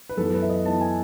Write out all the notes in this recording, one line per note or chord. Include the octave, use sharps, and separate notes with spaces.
B4
F#2 E3 B3 A4
B4
E5
D#5
F#2 E3 B3 A5
G#5